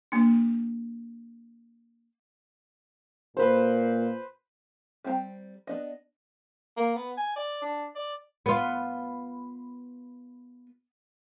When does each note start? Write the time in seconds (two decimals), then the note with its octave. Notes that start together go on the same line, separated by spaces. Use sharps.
0.12 A#3 D4
3.37 A#2 B4 C5
5.04 G3 C4 C5 G5 A#5
5.67 B3 D4 D#5
6.77 A#3
6.95 B3
7.17 G#5
7.36 D5
7.62 D4
7.95 D5
8.46 B3 F4